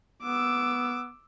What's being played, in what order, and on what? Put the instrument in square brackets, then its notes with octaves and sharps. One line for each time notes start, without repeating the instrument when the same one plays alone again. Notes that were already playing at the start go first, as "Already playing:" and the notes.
[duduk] B3 [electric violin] D6 E6